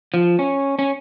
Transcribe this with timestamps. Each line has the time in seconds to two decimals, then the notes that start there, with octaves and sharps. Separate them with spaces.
0.14 F3
0.39 C#4
0.79 C#4